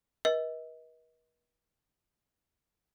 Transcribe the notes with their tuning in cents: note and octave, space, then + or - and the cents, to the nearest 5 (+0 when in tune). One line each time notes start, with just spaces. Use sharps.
B4 -45 D#5 +35